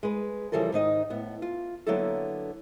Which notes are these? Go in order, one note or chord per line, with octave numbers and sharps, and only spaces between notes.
G#3 B4
C#3 E3 F3 G3 A4 A#4
G#2 D#3 D#4 D#5
A2 B3
F4
D3 F#3 A#3 B3 E4 A4